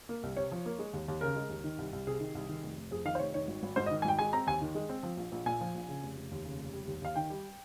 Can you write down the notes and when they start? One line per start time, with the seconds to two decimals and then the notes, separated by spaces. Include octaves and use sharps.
0.09 A#3
0.23 C2
0.36 C3 C#5
0.51 F3
0.66 A#3
0.79 G#3
0.93 D#2
1.08 D#2
1.21 C#3 A#4
1.36 G#3
1.49 D#2
1.64 D#3
1.78 C2
1.93 C2
2.07 C3 G#4
2.20 D#3
2.35 C2
2.49 D#3
2.64 F1
2.77 F1
2.91 F2 G#4
3.05 D#3 F5
3.15 C5
3.19 F1 C#5
3.34 D#3 C#5
3.48 G#1
3.63 G#1
3.76 G#2 C5
3.86 D#5
3.91 D#3
4.02 G#5
4.05 G#1 G5
4.19 G#3 G#5
4.33 C4 A#5
4.47 D#2 G#5
4.61 D#3
4.75 G#3
4.89 C4
5.03 F3
5.17 A#1
5.32 A#1
5.46 A#2 G#5
5.61 F3
5.75 A#1
5.88 C#3
6.03 F1
6.17 F1
6.31 D#2
6.45 C#3
6.59 F1
6.73 G3
6.87 D#2
7.02 D#2 F5
7.15 D#3 G5
7.30 G3